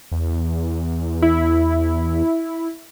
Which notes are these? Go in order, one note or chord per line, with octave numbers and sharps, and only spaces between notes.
E2
E4